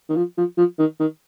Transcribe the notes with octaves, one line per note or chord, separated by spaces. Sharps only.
D#3
F3
F3
F3
D#3
D#3